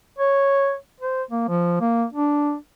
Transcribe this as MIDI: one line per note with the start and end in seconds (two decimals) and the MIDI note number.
0.19 0.75 73
1.00 1.23 72
1.31 1.44 58
1.49 1.78 53
1.81 2.05 58
2.13 2.55 62